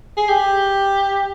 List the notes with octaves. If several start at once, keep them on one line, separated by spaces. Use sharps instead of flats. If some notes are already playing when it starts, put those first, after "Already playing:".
G#4
G4